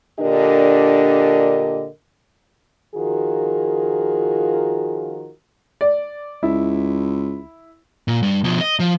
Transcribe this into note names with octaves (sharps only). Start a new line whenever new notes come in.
A#2 D3 D4 G4 A#4 D#5
D#3 F3 F4 F#4 G#4 A#4
D5
C#2 E4
A#2
G2
B2 F3
D#5
F3